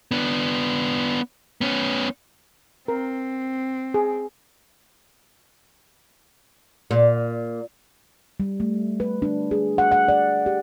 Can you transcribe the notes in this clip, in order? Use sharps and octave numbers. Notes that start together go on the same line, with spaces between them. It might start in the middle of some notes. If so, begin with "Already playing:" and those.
B3 D4
B3 C#4
C4 A#4
G#4
A#2
G3
A3
B4
D4
G#4
F#5
F#5
D5
G4